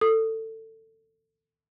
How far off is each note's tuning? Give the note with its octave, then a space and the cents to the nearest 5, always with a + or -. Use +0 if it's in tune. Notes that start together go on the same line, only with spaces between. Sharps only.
A4 +20 D#6 -5